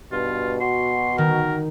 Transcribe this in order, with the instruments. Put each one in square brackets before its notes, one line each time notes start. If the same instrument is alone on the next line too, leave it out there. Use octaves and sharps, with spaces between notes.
[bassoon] G2 [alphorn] B2 [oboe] F4
[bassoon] F#4 [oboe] C6
[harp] D#3 [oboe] A#4